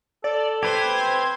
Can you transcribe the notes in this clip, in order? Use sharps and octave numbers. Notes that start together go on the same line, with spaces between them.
A4 D5
G4 B4 C5 G#6
C4